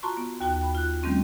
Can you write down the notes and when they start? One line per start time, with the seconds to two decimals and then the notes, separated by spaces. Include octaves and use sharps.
0.03 F4 F#4 A5 A#5 C6 C#6
0.17 B3
0.41 D#2 F#4 G5
0.63 B5
0.75 F4 F#6
1.03 D#3 G3 A3 C4 C#4